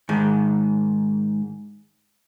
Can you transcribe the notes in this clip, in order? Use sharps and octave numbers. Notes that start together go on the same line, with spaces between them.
G#2 D#3